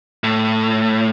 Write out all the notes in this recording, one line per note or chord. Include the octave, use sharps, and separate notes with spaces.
A2